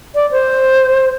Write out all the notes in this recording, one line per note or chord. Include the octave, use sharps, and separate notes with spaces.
D5
C5